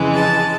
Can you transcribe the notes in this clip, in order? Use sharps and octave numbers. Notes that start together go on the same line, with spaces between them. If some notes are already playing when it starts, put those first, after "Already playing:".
Already playing: F2 C#3 E3 G#3
A5